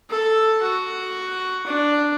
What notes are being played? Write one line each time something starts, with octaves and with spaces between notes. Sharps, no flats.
A4
F#4
D4